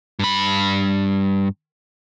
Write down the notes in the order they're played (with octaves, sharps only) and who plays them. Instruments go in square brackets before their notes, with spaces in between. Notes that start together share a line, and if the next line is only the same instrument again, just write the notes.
[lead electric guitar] G2 B5